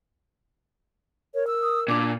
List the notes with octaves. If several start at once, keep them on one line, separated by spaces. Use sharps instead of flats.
A#4 C#5
E6
D#6
A#2 D4 D6